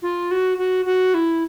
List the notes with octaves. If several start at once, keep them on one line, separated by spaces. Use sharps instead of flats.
F4
F#4
F#4
F#4
E4